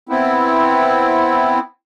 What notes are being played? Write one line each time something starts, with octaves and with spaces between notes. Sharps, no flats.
B3 C4 E4